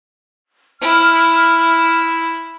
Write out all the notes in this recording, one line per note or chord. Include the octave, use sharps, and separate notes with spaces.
E4 F6